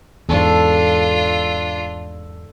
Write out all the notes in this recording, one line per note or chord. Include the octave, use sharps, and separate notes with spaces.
E2 G#2 D4 F4 A4 C#6